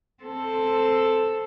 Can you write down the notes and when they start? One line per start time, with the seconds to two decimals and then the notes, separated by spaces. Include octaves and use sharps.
0.23 C4 A4